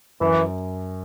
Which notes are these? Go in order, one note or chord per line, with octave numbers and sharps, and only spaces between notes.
F#2 E3